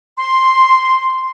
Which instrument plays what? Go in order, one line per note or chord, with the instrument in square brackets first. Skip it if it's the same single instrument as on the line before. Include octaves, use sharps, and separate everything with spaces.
[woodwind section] C6